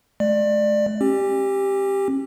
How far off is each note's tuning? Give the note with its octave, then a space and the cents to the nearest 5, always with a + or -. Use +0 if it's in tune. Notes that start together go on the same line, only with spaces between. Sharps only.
A3 -45 D5 +20
C#4 -45 G4 +0